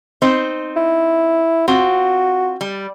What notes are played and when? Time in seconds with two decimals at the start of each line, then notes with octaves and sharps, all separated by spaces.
0.22 C4 D#4 C5
0.76 E4
1.68 C4 F4 F#4
2.61 G3